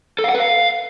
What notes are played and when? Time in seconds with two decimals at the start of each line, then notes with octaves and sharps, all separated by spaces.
0.19 A4
0.24 F5
0.29 F#5
0.35 B4
0.40 F5